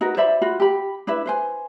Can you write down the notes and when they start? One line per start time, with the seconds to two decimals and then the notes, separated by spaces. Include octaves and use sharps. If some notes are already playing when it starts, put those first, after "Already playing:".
0.01 D#4 F#4 A#4 B4
0.17 C5 D5 E5 B5
0.42 F4 F#4 B5
0.60 G4 B5
1.07 D4 E4 B4 E5
1.26 B4 C5 G#5